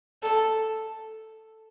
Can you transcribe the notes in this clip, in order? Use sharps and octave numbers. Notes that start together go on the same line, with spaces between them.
A4